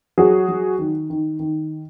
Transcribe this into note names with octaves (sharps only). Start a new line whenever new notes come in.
F#3 F#4 G#4
F#3
D#3
D#3
D#3